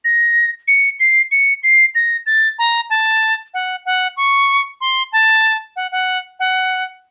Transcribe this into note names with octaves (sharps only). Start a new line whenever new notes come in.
A#6
C#7
C7
C#7
C7
A#6
A6
A#5
A5
F#5
F#5
C#6
C6
A5
F#5
F#5
F#5